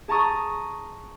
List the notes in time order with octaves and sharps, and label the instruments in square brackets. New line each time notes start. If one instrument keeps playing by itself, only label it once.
[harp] G#4 A5 A#5 C#6 D#6